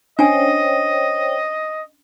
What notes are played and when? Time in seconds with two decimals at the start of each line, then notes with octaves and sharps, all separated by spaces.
0.19 C#4 D4 C5 C#5 D#5 G5 G#5